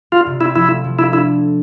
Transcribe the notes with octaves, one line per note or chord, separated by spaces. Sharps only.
G3 F4
C3
C4 E4
F3 E4
A3
F3
D4 E4
A3 E4